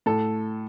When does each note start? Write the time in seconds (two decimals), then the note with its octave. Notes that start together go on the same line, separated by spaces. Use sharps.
0.06 A2 A4